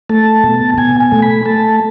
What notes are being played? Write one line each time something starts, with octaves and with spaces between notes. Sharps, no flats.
A3 A5
B2
B2 G#5
G#5
A3
B5
A3 A5